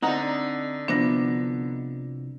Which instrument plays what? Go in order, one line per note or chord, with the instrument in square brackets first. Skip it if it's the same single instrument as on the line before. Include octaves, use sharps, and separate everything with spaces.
[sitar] D3 D#4 [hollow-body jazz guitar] C4 F#5 A#5
[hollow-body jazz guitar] C2 F3 B3 [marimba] D4 A#6